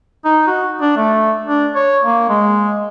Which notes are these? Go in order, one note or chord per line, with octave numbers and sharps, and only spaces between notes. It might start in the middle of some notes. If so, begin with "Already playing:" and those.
D#4
F#4
D4
A3
D4
C#5
A#3
G#3